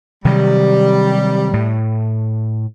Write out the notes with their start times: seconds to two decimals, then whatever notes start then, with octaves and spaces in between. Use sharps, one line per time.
0.25 C3 D#3 F#3 G3
1.53 A2